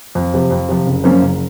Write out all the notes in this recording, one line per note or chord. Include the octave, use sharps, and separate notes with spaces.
F2
C3 F3
F2
C3 F3
F#1
F#2 F3 A#3 C#4
F#1